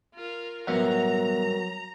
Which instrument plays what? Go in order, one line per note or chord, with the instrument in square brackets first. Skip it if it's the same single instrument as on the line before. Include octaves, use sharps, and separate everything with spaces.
[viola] F4 A#4
[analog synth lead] F#3 [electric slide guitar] G3 A#4 C#5 [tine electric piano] B3 E5 F#5 [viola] A#5